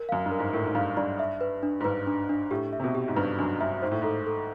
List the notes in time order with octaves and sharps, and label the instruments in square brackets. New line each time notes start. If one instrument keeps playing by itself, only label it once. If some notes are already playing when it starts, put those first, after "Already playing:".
Already playing: [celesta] A#4
[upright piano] F#2 [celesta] F5
[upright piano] G2
[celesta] A#4
[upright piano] G#2
[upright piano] A2 [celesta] A#4
[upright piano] G#2
[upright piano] G2 [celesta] F5
[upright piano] G2 [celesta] D5
[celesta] E5
B4
D4
[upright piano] G#2
[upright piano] G2 [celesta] B4
[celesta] D4
D4
[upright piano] A2 [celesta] G4
[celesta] E5
[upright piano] C3
B2
[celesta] G4
[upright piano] G#2
[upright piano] G2 [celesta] B4
[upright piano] F#2 [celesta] D4
[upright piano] G2 [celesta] E5
[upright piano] G#2 [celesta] C5
[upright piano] A2
[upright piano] G#2 [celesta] A4
[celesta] A4